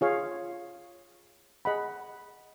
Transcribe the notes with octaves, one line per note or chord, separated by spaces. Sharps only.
F4 G#4 C#5 F5
G#4 D#5 F#5 B5